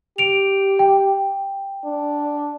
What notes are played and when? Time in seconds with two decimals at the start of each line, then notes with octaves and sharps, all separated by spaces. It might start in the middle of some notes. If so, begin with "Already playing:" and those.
0.18 G4 D7 F7
0.79 G5
1.84 D4